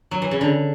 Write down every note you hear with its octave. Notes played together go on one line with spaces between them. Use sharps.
F#3
E3
C#3
D3